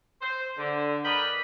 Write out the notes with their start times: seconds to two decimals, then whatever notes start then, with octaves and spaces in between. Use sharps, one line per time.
0.22 C5
0.58 D3
1.04 A#4 B4 D5 D#5 G5 B5